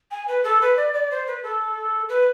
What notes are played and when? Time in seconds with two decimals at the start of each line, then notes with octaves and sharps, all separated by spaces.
0.11 G#5
0.27 B4
0.43 A4
0.61 B4
0.76 D5
0.93 D5
1.10 C5
1.26 B4
1.42 A4
2.08 B4